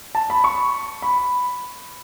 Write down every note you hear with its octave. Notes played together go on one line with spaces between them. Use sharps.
A5
B5
C#6
B5